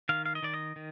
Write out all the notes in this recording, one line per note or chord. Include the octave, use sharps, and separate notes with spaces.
D#3 F5
F5
D#5
D#3 D5
D#5
D#3